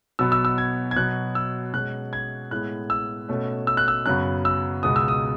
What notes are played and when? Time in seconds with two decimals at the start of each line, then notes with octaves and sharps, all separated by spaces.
0.19 B2 F#3 B3 E6
0.32 E6
0.45 E6
0.58 G#6
0.91 G#6
0.96 B2 F#3 B3 F#6
1.35 E6
1.74 B2 G#3 C#4 F#6
2.13 G#6
2.51 A2 G#3 B3 F#6
2.90 E6
3.28 B2 A3 C#4
3.67 E6
3.77 F#6
3.88 E6
4.06 F#2 C#3 F#3 B3 F#6
4.45 E6
4.83 C#2 B2 G#3 B3 D#6
4.96 E6
5.08 D#6